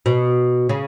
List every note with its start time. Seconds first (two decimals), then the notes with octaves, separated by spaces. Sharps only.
0.06 B2
0.69 C#3